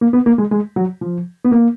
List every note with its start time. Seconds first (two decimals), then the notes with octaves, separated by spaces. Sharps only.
0.01 A#3
0.13 B3
0.26 A#3
0.38 G#3
0.51 G#3
0.76 F#3
1.01 F3
1.44 B3
1.52 A#3